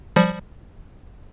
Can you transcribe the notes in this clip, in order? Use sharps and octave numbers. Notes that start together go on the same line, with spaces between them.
F3 G3